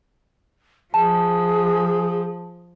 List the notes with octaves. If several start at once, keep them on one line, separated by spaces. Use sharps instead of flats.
F3 G#4 A5